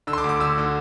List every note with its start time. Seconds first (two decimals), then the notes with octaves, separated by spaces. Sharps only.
0.07 D3 E6
0.13 C6
0.18 D6
0.24 D2
0.29 D6
0.40 D2 E6
0.58 D3